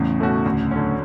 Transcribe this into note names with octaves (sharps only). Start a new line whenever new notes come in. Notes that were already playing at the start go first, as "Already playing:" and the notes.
Already playing: E2 A2 C#3
B2 A3 C#4 F#4
D2
D3 F#3 C#4